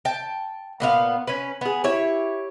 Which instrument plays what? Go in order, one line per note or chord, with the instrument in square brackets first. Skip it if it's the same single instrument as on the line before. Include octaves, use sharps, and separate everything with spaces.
[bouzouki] G5 A5
A#2 B3 F4 F5
C#4 B4
B3 G#4
E4 G4 C#5